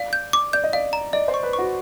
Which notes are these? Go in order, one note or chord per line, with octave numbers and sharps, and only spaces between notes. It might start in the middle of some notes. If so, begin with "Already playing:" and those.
Already playing: D5 F5
G6
D6
D5 G6
D#5
D5 F5
A#5
D5 D#5
C5
C#6
B4
C#6
F#4